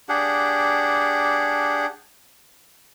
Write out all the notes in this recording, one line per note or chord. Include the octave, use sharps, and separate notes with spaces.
D4 G4 G#4 F#5